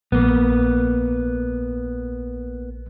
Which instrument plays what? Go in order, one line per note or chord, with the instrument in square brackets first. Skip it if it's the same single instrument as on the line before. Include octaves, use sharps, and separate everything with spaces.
[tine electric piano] A#1 [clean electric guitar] A#3 B3